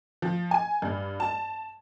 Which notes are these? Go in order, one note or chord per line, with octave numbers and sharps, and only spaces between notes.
F3
G#5
G2
A5